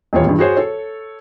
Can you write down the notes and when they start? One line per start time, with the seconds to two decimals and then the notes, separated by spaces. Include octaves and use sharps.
0.13 D#1 E2 F4 C#5
0.27 E2 G2
0.39 F#4 G#4 C5 C#5
0.57 A4 C#5